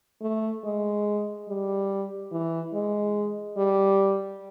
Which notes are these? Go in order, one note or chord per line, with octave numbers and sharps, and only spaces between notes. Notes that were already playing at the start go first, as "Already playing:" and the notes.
A3
G#3
G3
E3
G#3
G3